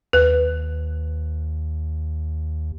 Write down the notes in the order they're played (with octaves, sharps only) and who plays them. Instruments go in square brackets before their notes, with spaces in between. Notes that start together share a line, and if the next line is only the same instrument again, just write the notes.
[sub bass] D#2 [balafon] B4